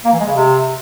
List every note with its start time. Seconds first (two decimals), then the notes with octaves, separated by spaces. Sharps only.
0.05 A#3
0.12 E3
0.20 G#3
0.27 C#3
0.35 C3